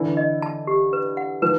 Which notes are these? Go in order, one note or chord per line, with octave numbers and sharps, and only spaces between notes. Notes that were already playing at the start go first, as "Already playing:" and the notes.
Already playing: D3 E3
D#5
A5
G4
B4
F#5
D#3 F3 B4